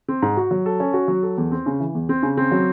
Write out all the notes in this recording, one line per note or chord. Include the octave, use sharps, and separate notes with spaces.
C4
G#2
F#4
F#3
A4
C#4
F#4
F#3
A4
E2
C4
C#3
E3
E2
C4
C#3
C4
F#3